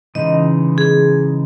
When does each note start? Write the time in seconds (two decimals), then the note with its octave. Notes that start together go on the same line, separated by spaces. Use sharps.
0.15 C#3 E3 G#3 D#4 D#5
0.78 G#4